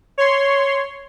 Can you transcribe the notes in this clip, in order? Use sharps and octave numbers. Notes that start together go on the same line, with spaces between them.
C#5 C6